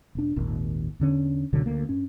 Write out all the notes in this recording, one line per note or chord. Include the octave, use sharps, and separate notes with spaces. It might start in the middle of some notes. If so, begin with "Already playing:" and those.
E1 D4
G#1 D#2 A#2
E2 D3 C#4
C#2 B2 D3 F#3
D2 A#3
G2 C#4